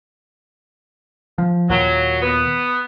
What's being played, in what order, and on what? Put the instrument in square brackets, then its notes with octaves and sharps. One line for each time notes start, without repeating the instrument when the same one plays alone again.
[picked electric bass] F3
[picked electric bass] D#2 A#2 [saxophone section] F#3
[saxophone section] B3